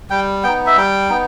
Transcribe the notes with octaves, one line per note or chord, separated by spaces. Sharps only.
G3 G5
B3 D#4 G5
E5
G3 G5
B3 D#4